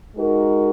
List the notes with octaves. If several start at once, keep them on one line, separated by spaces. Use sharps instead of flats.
G#3 D#4 F#4 A#4